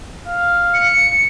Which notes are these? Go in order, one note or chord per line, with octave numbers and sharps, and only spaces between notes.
F5
C#7